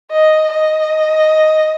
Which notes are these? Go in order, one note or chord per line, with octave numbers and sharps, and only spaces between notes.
D#5
D#5